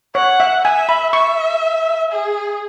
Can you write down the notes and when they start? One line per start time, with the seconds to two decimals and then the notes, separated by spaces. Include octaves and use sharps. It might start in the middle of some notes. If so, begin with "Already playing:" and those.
0.15 C#5 F#5
0.40 E5
0.65 E5 G#5
0.89 B5
1.13 E5 C#6
2.12 G#4